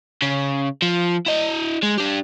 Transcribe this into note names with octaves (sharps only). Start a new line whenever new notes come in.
C#3
F3
E4 D#5
G#3
D4 G4